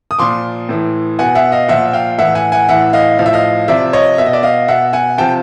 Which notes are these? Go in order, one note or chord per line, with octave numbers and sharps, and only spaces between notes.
D#6
A#2 F3 C6 D6
A2 E3
B2 F#5 G#5
E5 F#5
D#5 F5
A#2 F3 E5 F#5
F5 G5
A2 E3 E5 F#5
F#5 G#5
F#5 G#5
A2 E3 E5 F#5
D#5 F5
A2 F3 F5
E5
D#5 F5
C3 F3 D5 E5
C#5 D#5
B2 E5
D#5
D5 E5
D#5 F5
B2 E5 F#5
F#5 G#5
C3 F3 G5 A5